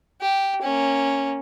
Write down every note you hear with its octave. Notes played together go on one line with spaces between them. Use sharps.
G4
A#3 C#4